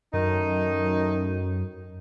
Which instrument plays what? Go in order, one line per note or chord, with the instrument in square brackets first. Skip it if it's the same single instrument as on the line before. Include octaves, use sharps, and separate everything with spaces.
[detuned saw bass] F#2 [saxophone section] A2 D#4 [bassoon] D#3